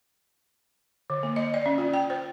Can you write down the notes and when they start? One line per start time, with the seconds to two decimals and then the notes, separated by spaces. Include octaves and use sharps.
1.10 D3
1.23 A#3
1.36 D#5
1.54 D5
1.66 C#4
1.78 F4
1.94 G5
2.10 C5